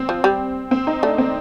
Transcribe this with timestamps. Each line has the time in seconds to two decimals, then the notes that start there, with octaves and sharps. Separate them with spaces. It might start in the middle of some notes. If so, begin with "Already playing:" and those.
Already playing: C4
0.09 F3
0.24 G3
0.71 C4
0.87 D#4
1.02 A3 D4
1.18 C4